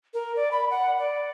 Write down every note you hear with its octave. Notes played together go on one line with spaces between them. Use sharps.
A#4
D5
B5
F#5
D5